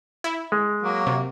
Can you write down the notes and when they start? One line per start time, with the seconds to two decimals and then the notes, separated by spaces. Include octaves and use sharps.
0.24 E4
0.52 G#3
0.83 F#3 A#3
1.07 C3